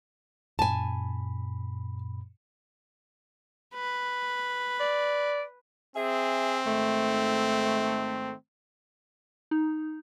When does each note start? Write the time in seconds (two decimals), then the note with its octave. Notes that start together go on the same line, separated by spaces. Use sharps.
0.59 F#2 A#2 G#5 A5 B5
3.74 B4
4.80 D5
5.95 C4 G#4 E5
6.65 G#2 D#3 A3
9.51 D#4